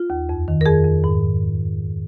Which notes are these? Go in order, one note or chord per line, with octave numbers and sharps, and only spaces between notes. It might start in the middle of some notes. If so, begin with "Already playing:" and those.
Already playing: F4
D#2
F2
D#3
A#4
F2 G#4
F2
G#2